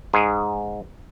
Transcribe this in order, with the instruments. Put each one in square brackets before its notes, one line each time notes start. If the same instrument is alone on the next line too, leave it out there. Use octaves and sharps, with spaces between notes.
[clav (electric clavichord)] G#2 G#4